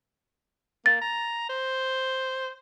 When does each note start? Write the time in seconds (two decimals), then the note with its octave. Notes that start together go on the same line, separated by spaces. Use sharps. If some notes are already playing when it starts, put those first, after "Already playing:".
0.86 A#3 A6
1.01 A#5
1.49 C5